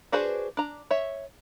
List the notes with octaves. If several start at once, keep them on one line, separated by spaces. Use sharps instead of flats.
D4 F#4 G#4 B4 C5
D4 A#5
C#5 E5